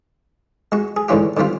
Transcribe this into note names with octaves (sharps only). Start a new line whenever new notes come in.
G#3 F#4
G#4
G#2 D3 E3 C#4 F4 G4
D3 D#3 G3 C4 F4